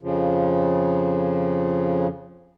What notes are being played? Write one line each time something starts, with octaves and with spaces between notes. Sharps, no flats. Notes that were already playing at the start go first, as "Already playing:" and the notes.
F2 C#3 F3